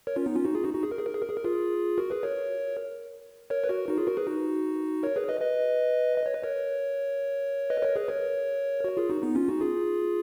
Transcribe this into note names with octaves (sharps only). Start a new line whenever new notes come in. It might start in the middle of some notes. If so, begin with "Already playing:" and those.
A#4 C#5
C#4 F4
B3 D#4
C#4 F4
D#4 F#4
F4 G#4
D#4 F#4
D#4 F#4
G#4
A#4
G#4
A#4
G#4
A#4
G#4
A#4
F4 G#4
F#4 A#4
G#4 B4
A#4 C#5
A#4 C#5
B4
F#4 A#4
D#4 F#4
F4 G#4
F#4 A#4
G#4 B4
D#4 F#4
A#4 C#5
G#4 B4
B4 D#5
B4 D#5
D#5
C#5
B4
A#4 C#5
B4 D#5
A#4 C#5
G#4 B4
A#4 C#5
F#4 A#4
F4 G#4
D#4 F#4
B3 D#4
C#4 F4
D#4 F#4
F4 G#4